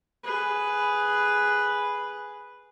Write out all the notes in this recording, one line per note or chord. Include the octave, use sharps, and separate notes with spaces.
G#4 B4